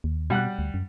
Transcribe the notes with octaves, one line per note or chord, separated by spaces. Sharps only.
D#2
B2 G3 F#5 F#6
D2
F#2